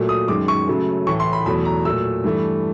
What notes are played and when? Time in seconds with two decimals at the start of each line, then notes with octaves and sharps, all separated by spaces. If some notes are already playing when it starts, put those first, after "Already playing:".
Already playing: A#2 F#3 A3
0.09 D#6
0.28 F#2 D#3 G#3 D6
0.48 C#6
0.68 F#2 C#3 F#3 A3
1.07 A2 E3 A3 C#6
1.20 C6
1.33 B5
1.46 E2 B2 F#3 A3 B5
1.65 A#5
1.85 A#2 F#3 A3 E6
2.24 G2 E3 A3